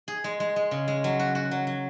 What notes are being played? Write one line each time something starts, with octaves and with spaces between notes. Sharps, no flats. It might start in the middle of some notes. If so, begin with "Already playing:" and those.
G#4
G#3
G#3
G#3
C#3
G#3
F#3
F#4
F#4
F#3
F#3